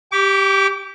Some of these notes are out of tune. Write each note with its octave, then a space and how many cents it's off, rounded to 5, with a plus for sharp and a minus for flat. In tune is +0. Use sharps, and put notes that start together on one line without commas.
G4 +0 D6 -35